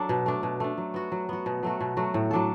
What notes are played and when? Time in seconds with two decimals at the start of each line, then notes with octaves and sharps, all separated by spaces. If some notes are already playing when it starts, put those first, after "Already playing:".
Already playing: F#3 D4 A4
0.09 B2
0.26 A3 D4
0.43 B2
0.60 A3 D4
0.78 F#3
0.94 B3 F#4
1.12 F#3
1.29 B3 F#4
1.46 B2
1.63 F#3 A3 F#4
1.80 B2
1.97 F#3 A3 F#4
2.14 A2
2.31 F#3 D4 A4